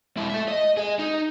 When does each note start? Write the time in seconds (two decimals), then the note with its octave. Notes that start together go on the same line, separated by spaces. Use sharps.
0.17 G#3 E4
0.30 A4 E5
0.48 D#5
0.77 G#4 D#5
0.99 D#4